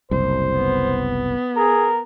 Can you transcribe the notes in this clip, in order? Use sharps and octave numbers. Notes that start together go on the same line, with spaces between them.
F#1 C2 C5
B3
G#4 A#4